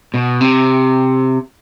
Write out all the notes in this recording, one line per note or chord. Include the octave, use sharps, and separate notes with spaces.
B2
C3